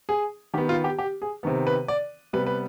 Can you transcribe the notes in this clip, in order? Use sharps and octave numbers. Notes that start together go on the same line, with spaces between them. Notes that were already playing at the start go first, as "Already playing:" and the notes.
G#4
D#3 B3 G4
F4
G4
G4
G#4
C3 D#3 B3
B4
D5
C3 G3 B3 B4
B4